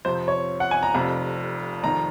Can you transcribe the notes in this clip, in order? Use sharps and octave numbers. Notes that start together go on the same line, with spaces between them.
F2 C3 F3 C5
C#5
F#5
G#5
A#5
F1 F2 C3
F1 F2 D#3 A#5